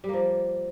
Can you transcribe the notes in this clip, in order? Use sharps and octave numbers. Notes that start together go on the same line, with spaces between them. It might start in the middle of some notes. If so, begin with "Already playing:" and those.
F3 G3 A#3